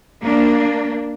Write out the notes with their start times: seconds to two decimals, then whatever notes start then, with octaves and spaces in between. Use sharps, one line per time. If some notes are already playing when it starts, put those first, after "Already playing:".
0.22 A#3 D4